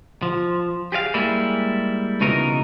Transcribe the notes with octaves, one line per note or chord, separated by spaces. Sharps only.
F3
G4 G#4 D5 F5
G3 G#3 A#3 E4
C#2 B2 E3 D#4 A#4 A#5